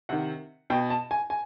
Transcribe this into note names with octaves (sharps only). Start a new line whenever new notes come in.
C3 D#3 F#5
B2 G5
A5
G#5
G#5